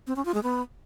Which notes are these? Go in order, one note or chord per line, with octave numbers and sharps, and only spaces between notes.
C4
C#4
F4
G#3
B3